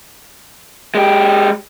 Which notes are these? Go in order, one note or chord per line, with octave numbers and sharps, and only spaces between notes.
G#3 G4